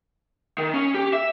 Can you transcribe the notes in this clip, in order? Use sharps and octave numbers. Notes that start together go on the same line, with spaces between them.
D#3
C#4
G4
E5